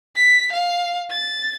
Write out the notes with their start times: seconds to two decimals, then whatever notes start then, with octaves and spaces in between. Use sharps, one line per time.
0.16 B6
0.52 F5
1.10 A6